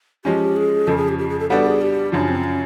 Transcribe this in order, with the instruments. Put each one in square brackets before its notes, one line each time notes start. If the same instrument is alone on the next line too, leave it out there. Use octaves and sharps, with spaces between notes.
[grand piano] F3 G#3 C#4 [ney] G4
[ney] G#4
[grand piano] F2 C#3 F3 [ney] A4
[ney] G#4
G4
G4
G#4
A4
[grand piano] G3 B3 D4 F#4 [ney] A4
[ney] G#4
G4
[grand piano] F#2 C#3 F3 [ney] D4
[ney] C4
C#4